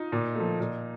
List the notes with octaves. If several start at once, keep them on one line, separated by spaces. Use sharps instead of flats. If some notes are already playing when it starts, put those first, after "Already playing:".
Already playing: D#4 F4
A#2
F3 A3
A#2